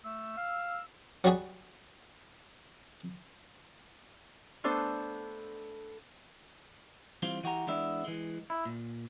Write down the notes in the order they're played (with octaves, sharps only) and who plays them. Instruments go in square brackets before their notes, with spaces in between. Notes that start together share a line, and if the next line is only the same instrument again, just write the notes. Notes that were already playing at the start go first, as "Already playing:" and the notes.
[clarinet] A3 [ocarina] E6
[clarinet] F5
[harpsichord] F#3 G3 F#4 G#4
[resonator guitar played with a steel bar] A3 B3 D4 A4 C5
[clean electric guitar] E3 G3 C4 F4
E3 F#4 G4 A#5
E3 G#3 B3 D4 E5
E3 G#3
E4
A#2